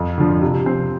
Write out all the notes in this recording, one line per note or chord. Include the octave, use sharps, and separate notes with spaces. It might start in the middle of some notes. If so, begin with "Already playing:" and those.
Already playing: F2
D3 F3
C3
F3 C4